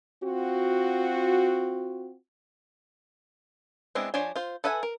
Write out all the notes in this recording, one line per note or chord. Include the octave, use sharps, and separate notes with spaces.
C4 F4 F#4
G#3 B3 C4 D4 E4
F3 D4 C5 C#5 G#5
F4 C5
A4 B4 E5 F#5 G#5
A#4